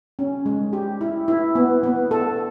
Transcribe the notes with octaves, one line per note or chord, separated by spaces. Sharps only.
C#4
G#3
G4
E4
E4
B3
B3
A4